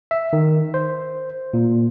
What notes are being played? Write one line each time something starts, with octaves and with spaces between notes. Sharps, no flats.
E5
D#3
C5
A#2